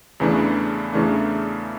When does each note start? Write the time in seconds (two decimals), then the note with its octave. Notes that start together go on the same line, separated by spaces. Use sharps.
0.20 E2 C#3 E3 A3 D4
0.93 E2 C#3 E3 A3 D4